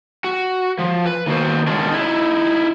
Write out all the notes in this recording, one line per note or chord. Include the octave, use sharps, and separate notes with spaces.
F#4
F3
B4
D#3 A#3 B3 F#4 C5
B2 D#3 G#3 C#4 D4
D#4 E4